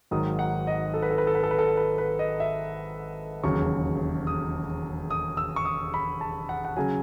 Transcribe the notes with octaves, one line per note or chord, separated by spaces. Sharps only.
G#1 G#2 D#3 F#3 D#6
F#5
D#5
A4
B4
A4
B4
A4
B4
A4
B4
A4
B4
B4
D#5
E5
E1 D#2 C#3 F#3 C#6
D#6
D#6
E6
C#6
D#6
B5
A5
F#5
F#5
C#3 F#3 G#5